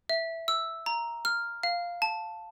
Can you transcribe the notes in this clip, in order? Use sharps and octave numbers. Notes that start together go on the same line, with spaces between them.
E5
E6
A#5
F6
F5
A5